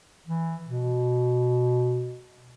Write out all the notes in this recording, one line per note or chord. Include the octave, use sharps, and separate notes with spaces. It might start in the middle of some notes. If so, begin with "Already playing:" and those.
E3
B2